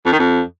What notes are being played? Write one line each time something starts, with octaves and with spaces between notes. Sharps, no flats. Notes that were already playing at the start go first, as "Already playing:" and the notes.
F2
D#3
F2